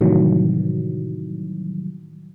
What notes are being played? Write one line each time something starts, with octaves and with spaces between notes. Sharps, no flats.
A2 C3 D#3 E3 F#3 G3